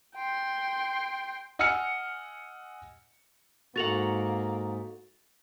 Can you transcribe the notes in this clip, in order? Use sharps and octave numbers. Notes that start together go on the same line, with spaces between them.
G5 C6
D#5 F#5 G#5 E6 F6 C#7
G#2 A#3 F#4 A4 F#5 A6 F7 F#7